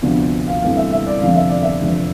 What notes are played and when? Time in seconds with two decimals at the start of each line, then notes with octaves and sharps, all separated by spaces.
0.02 D2 C3 F3 B3 D4
0.47 F5
0.62 G1 G2 E3 A3 C4 F5
0.77 E5
0.92 E5
1.07 D5
1.21 F1 F2 D3 F3 F5
1.36 E5
1.49 D5
1.63 E5
1.82 F1 E2 D3 F3